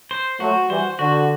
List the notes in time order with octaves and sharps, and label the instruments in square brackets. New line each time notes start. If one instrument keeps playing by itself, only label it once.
[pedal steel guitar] C5
[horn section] F#3 A3 [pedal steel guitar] F#4
[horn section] E3 G3 [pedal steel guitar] C5
[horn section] D3 [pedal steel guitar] F#4